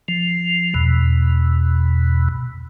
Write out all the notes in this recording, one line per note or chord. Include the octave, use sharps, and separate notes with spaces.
F3
E2 B2